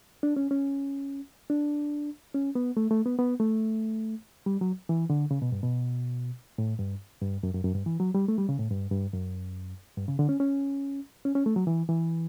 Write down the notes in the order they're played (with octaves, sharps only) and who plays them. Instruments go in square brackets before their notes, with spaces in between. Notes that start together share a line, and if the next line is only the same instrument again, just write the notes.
[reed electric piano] D4
C#4
C#4
D4
C#4
B3
A3
A3
B3
B3
A3
G3
F#3
E3
D3
C#3
B2
G2
B2
A2
G2
G2
F#2
F#2
F#2
G2
E3
F#3
G3
A3
G3
C#3
A2
G2
G2
F#2
G2
C#3
D3
C#4
C#4
C#4
C#4
A3
F#3
E3
E3